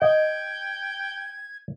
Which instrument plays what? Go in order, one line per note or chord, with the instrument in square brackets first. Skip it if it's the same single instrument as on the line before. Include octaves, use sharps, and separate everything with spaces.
[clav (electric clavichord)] D#5 [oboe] G5 [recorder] G#6